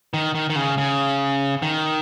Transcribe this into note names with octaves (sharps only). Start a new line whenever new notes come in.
D#3
D#3
D#3
C#3
C#3
D#3